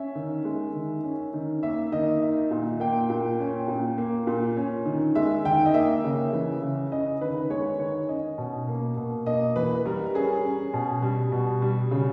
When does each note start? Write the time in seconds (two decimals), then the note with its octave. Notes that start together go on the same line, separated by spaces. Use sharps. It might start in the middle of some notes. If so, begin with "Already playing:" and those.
Already playing: C#4 E5
0.15 D#3
0.45 G#3
0.75 D#3
1.04 C#4
1.34 D#3
1.63 A#3 E5
1.92 D#3 D#5
2.22 D#4 E5
2.51 A#2
2.80 A#3 G5
3.10 A#2
3.40 C#4
3.68 A#2
3.98 A#3
4.27 A#2
4.57 C#4
4.86 D#3
5.15 G#3 E5
5.45 D#3 G5
5.66 D#5
5.74 A#3 E5
6.04 C#3
6.33 E3
6.62 C#3
6.92 C#4 D#5
7.21 D#3 B4
7.50 G#3 C#5
7.79 D#3 C#5
8.09 C#4 D#5
8.38 B2
8.68 A#3
8.97 B2
9.26 A#3 D#5
9.56 E3 B4
9.85 G3 A#4
10.14 C#4 G#4
10.45 C#4
10.74 B2
11.02 G3
11.32 B2
11.62 G3
11.91 C#3